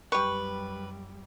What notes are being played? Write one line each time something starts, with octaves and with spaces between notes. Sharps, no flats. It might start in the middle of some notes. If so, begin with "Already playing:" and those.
F#2 G3 G4 B4 C#6